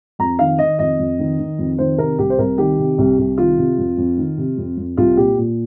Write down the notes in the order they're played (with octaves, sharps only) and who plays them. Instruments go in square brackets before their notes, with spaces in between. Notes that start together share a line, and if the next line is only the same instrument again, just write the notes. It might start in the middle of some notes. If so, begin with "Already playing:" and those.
[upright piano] F2 A#5
D#3 F5
D#3 D#5
F2 D#5
F2
D#3
D#3
F2
D#3 C5
C3 A#4
C2 G4
C5
C2 A#4
D#3 G4
C3
C2
C2
D#3 F4
C3
F2
F2
D#3
C3
F2
F2
C2 F4
A#2 G4
A#2